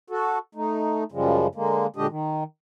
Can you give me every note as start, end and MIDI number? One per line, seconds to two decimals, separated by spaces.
0.10 0.38 66
0.10 0.38 69
0.55 1.04 57
0.55 1.04 63
1.12 1.47 42
1.12 1.47 49
1.12 1.47 53
1.12 1.47 55
1.12 1.47 56
1.55 1.87 50
1.55 1.87 56
1.55 1.87 58
1.96 2.07 46
1.96 2.07 50
1.96 2.07 56
1.96 2.07 62
1.96 2.07 67
1.96 2.07 75
2.09 2.44 51